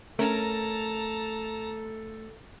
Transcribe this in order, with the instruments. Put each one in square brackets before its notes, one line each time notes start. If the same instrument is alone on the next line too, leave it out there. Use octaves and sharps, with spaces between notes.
[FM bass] A3 [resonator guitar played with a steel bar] C#4 A#4 [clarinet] A4 [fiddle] A5 A#5